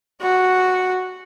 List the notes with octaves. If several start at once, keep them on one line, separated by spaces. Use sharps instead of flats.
F#4